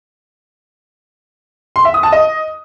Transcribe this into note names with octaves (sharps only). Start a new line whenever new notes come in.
C6
E5
D#6
A5
D#5